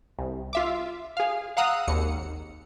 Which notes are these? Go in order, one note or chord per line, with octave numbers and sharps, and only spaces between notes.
C2
F4 E5 D6
G#4 F5
F5 F#5 A#5 D#6 E6 F#6
G#1 D#2 C#7